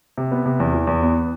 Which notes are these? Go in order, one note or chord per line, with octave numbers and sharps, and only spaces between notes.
C3
B3
C3
E2
E3
E2
B3